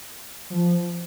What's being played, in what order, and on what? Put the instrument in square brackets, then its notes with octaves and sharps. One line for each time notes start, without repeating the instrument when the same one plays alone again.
[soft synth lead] F3